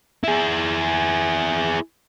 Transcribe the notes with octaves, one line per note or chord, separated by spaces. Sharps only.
E4 G#4